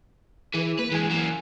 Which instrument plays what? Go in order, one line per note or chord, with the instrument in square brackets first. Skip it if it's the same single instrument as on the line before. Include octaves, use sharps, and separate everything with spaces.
[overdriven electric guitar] E3 [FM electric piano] G#4 B4
[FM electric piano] A#3 [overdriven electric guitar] B4
[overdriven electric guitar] G2 G#3 [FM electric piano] E3 G#5
[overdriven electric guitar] F#3 A#3